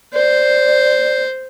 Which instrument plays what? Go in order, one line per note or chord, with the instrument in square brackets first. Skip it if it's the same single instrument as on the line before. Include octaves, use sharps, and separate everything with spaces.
[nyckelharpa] C5 [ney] D5